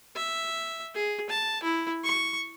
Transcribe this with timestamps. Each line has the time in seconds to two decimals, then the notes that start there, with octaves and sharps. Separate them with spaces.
0.16 E5
0.94 G#4
1.30 A5
1.63 E4
2.04 C#6